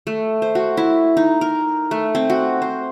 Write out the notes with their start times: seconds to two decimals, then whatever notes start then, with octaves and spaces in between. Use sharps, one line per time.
0.07 A3
0.42 C5
0.55 F#4
0.77 E4
1.17 D#4
1.41 A#4
1.91 A3
2.15 C4
2.30 F#4
2.62 C5